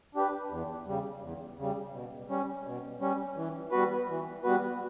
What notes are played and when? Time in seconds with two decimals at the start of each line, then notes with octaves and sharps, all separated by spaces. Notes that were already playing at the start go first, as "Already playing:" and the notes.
0.15 D4 G4 B4
0.50 E2
0.87 C#3 G3
1.21 E2
1.58 C#3 G3
1.93 B2
2.29 G3 C#4
2.65 B2
3.01 G3 C#4
3.36 E3
3.71 G3 B3 F#4 B4
4.08 E3
4.43 G3 B3 F#4 B4